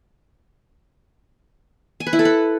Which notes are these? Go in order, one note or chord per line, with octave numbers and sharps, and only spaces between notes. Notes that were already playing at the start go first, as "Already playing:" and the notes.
G#5
B4
E4
A4
B4